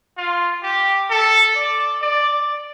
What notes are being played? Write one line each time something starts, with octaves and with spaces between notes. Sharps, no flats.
F4
G4
A4
D5
D5